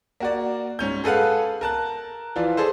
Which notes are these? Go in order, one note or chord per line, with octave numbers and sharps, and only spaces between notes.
A#3 F#4 D5
G#2 C#4 G6
G#4 A4 B4 F5 F#5
A#4 A5 F#6
E3 F3 F4 D5
G#4 A4 C5